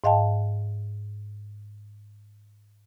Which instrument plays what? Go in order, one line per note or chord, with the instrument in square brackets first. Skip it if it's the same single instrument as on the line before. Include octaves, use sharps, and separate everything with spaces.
[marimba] G#2 D#5 F5 G5 A5